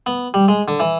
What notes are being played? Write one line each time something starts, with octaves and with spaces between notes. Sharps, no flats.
B3
G3
G#3
D3
E3